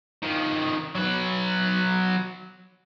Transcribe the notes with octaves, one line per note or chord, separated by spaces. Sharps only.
D#3 F3
F#3 B4